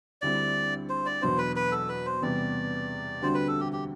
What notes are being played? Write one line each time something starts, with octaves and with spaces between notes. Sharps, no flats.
D2 D3 G3 C4 E4 D5
C5
D5
E2 B2 F#3 B3 D4 C5
B4
B4
A4
B4
C5
E2 C3 G3 B3 D5
D2 D3 G3 C4 F#4 C5
B4
A4
G4
G4